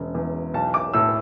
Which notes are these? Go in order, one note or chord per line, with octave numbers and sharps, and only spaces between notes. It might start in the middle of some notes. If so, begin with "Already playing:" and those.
Already playing: E1 C#3
E2
B1 A5
D6
A2 E6